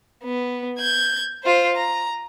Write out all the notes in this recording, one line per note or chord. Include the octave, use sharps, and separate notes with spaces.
B3
G6 G#6
F4 C5
A#5